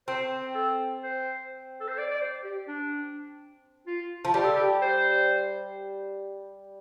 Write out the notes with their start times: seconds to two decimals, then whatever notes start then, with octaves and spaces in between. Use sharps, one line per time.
0.08 C4 C5
0.55 A4
1.03 C5
1.80 A4
1.88 C5
1.98 D5
2.11 D5
2.22 C5
2.44 G4
2.68 D4
3.87 F4
4.25 F3
4.34 G3 G4
4.44 A4
4.55 G4
4.82 C5